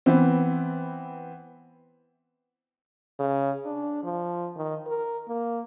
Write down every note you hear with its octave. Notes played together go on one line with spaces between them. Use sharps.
E3 B3 C4
C#3
D4
F3
D#3
A#4
A#3